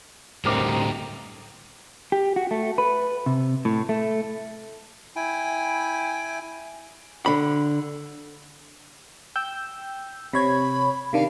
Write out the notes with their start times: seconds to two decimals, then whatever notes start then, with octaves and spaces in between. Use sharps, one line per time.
0.45 D2 A2 D3 G3 C4 D#4 A#4 D6
2.12 G4
2.36 F#4
2.51 A3
2.78 B4
3.26 C3
3.65 A2
3.89 A3
5.16 E4 G5 G#5
7.26 D3 B5
9.36 G5 E6 G6
10.33 C3 C#5 B5 G#6
11.13 C3 D#3 D4 F5